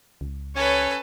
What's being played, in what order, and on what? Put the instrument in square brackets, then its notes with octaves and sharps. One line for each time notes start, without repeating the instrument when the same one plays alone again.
[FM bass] C#2
[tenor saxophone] C#4 [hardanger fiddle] A4 B4 [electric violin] C#5